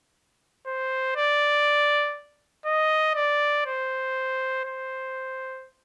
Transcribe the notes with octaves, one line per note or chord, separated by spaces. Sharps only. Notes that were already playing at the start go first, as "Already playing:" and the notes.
C5
D5
D#5
D5
C5
C5